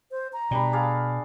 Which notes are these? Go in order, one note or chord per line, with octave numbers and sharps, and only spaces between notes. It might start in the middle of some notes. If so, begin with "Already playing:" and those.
C5
A#5
B2 G3 D4 B5
G#4 D5 F5